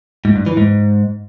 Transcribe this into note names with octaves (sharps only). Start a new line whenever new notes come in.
G#2
G2
E3
G#2